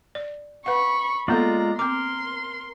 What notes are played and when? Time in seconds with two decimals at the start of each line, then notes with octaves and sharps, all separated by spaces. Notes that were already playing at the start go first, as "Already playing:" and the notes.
0.15 D5
0.66 B4 F5 F#5 B5 C#6
1.28 G#3 A#3 B3 F4 A4 D5 A#5
1.79 C4 A#4 C6 D6